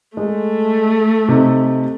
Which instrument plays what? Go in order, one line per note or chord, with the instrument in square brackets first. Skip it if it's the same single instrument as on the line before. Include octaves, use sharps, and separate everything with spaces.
[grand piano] G#3 [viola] A3
[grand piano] C3 D#4